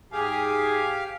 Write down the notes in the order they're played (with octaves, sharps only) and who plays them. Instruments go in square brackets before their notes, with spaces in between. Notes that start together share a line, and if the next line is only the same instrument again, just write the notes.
[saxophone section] G#2 G#4 [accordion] G4 F5 [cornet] G#5